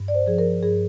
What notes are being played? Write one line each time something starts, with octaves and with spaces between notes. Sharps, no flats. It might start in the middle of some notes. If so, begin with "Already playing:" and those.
Already playing: G2
D5
C5
F3 G#4
A#4
G2 G#4